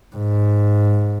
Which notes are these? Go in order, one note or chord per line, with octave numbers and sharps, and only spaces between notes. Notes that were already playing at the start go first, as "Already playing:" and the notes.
G#2